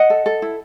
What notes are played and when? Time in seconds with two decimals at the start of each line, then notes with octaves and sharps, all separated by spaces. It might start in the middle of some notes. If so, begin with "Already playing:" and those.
Already playing: D#5 F#5
0.10 A4
0.26 A4
0.42 E4